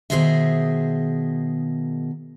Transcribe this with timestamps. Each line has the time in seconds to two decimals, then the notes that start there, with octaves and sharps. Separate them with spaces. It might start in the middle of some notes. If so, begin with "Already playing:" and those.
0.10 B2 D#3 G#4 C5 D#5 E5